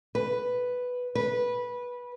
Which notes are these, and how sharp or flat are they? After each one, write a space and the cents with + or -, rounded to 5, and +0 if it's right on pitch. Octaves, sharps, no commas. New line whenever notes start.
B4 +0
B4 -15